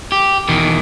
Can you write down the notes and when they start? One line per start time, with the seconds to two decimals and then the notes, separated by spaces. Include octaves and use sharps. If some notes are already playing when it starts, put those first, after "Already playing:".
0.12 G4
0.48 E2 B2 D#3